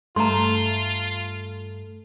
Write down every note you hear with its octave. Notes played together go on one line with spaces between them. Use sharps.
G2 A3 F4 A#5 C6